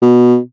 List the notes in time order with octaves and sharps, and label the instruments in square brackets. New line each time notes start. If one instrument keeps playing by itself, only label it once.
[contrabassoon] B2